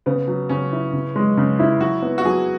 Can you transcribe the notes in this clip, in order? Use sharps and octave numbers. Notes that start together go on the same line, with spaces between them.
C#3 B3
F#3
C#3 C#4
E4
C#3
G#3
C#3
E4
F#3 F#4
B3
F#4
F#3 G#4